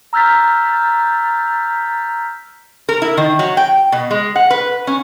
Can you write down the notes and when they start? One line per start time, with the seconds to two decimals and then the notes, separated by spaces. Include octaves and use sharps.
0.13 A#5 E6 F6 G6 A6 B6
2.89 A#4
3.02 E4
3.17 D#3
3.39 F#3
3.57 G5
3.92 B2
4.11 G#3
4.36 F#5
4.51 B4
4.87 C#4